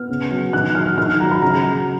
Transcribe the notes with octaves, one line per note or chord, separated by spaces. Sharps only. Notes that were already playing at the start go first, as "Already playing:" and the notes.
Already playing: B3 F6
C#3
F#3
D#3 F#6
F#3 F6
D#3 F6
F#3 A#5
B5
C#3 A#5
F#3